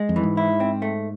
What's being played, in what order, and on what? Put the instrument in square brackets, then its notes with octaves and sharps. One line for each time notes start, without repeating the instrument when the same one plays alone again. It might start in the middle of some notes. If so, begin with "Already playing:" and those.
Already playing: [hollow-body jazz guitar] G#3
[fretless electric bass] F2
[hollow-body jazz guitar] E3
[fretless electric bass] G#2
[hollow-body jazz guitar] E4
C4
A3